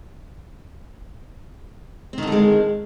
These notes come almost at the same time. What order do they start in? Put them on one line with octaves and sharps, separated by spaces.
C4 D#3 D3 A3 G#3